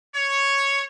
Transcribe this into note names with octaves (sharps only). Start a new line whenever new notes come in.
C#5